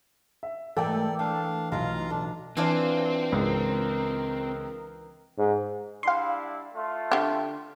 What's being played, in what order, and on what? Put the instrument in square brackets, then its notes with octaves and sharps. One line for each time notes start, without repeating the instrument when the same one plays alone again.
[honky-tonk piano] E5
[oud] G#2 G3 A3 [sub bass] E3 [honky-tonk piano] A4 A#4 G5 [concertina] D5
[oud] A3 [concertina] D4 F5
[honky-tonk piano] B1 [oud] A2 C3 F#3 [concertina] F4 F5 A#5
[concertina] D4 [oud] A4
[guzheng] E3 D4 F4 [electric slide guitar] C4
[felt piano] C#2 [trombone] A#4
[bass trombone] G#2
[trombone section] G3 D4 E4 [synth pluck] F5 C6
[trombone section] A3 F4
[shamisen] D3 G4